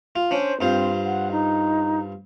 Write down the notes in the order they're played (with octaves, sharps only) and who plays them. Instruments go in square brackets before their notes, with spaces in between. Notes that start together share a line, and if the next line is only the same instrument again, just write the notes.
[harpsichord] F4
[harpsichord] C#4 D4 [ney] C5
[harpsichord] G2 F4 C5 [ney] C4
[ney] F#5
D#4